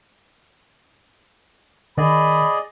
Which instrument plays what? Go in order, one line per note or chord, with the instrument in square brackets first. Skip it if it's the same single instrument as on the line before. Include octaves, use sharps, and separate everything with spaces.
[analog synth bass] D#3 [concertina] G#4 D5 D#5 [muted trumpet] B5